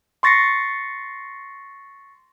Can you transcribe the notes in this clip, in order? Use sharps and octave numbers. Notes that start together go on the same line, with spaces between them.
C6 C#6 A6 A#6 C7 C#7